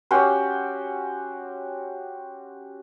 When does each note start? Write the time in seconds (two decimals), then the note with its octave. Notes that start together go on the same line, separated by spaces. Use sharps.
0.11 C#4 F#4 G4 C5